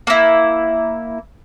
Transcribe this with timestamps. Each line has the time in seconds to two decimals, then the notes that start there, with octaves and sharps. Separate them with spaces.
0.07 A#3 E4